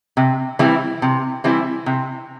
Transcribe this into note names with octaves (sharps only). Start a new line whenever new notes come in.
C3
E3 G3 C4 E4
C3
E3 G3 C4 E4
C3